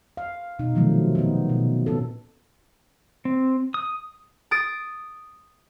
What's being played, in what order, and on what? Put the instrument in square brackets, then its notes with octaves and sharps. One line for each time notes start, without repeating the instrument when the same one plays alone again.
[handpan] F5
B2 D#4
C3 D#3 F3 F#3 A3
B3 D#4
B2
A#2 B3 C#4 A4
[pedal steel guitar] C4
D#6
[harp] D#6 A6 D7